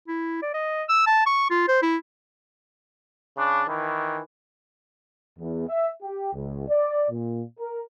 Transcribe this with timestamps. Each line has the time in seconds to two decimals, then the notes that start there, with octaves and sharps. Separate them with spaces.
0.08 E4
0.42 D5
0.54 D#5
0.89 E6
1.07 A5
1.26 C#6
1.50 F4
1.68 C5
1.82 E4
3.37 C#3 D4
3.68 D#3 E3
5.39 E2
5.68 E5
6.02 G4
6.34 C#2
6.69 D5
7.10 A#2
7.58 A#4